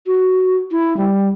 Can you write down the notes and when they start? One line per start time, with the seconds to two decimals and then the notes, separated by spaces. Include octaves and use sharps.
0.07 F#4
0.71 E4
0.97 G3